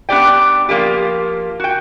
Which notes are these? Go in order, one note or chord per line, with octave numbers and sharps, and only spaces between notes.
B3 D4 G4 D5 G5
F3 A#3 F4 G4
F#4 G5